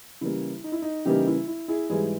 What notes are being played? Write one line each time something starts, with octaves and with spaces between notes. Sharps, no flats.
C#3 E3 G3 A#3 E4
D#4
E4
D#4
C#3 E3 G3 A#3 D#4 G4
E4
E4
E4 G#4
G#2 E3 G3 E4 G#4